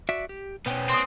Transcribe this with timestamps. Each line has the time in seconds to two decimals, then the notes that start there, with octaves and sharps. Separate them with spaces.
0.09 F#4 D5 E5
0.29 G4
0.66 B2 B3 C#4 C5 G5
0.90 C4 C6 D#6